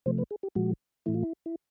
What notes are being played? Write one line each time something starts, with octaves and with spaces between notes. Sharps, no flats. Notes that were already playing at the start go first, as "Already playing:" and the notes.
C3 F3 A3 C5
B4
G#4
G4
A#2 F3 G#3 F#4
A2 E3 A3 E4
F4
E4
E4